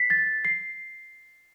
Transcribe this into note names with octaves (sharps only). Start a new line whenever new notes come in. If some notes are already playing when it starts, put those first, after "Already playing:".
Already playing: B6 C7
A6
C7